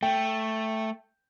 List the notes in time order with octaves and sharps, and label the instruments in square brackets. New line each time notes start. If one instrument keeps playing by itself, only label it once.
[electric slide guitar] A3 [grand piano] G5